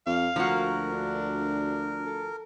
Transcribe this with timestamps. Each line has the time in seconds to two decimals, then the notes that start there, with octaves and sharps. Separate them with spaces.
0.06 F2 F5
0.36 D2 F3 A#3 F#4 A#4
0.93 D4
2.05 A4